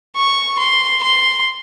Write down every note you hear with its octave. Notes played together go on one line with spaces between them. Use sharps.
C#6
C6
C6